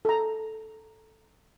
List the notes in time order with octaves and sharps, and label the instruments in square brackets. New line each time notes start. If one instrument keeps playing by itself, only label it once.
[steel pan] A4 A#5